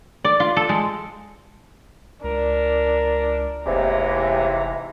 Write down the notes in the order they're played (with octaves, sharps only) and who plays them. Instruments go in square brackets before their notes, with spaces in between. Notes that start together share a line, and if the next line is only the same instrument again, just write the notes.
[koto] D5
F4
A4
G#3
[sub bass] C#2 [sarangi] D4 [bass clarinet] A#4
[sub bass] F1 [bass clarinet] D#2 [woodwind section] G#2 C3 E3 [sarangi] A#5